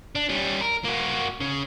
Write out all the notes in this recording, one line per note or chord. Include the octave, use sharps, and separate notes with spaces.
D4
G3 C#4
A#4
A#3 F#4
C#3